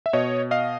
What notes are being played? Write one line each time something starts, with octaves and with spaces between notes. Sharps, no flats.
E5
B2 C#5 D#5
D#5 F5